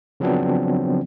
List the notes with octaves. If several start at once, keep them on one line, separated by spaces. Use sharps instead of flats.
C#3 F3 F#3 B3 C4 D4